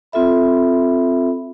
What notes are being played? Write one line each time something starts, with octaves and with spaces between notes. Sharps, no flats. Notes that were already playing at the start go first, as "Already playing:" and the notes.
C4 F4 A4 E5 B5